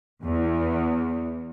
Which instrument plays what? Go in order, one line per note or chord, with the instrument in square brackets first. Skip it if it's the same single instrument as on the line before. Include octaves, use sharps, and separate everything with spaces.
[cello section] E2